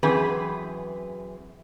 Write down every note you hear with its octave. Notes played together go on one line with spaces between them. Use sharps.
F#2 E3 C4 G#4 B4